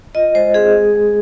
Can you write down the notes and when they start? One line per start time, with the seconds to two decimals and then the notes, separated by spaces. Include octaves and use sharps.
0.15 F4 D#5
0.34 G#3 C5
0.54 C4 G#4
0.75 G#3
0.95 G#3